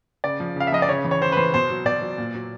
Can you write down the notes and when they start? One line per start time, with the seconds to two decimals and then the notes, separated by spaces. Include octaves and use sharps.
0.24 C#3 D5
0.40 F3
0.56 C#3 F5
0.67 E5
0.72 F3 D#5
0.82 D5
0.89 C#3 C#5
1.05 E3
1.11 C#5
1.21 C#3 C5
1.32 B4
1.37 E3 C5
1.54 B2 C5
1.70 F#3
1.85 B2 D5
2.02 F#3
2.18 A#2
2.34 F#3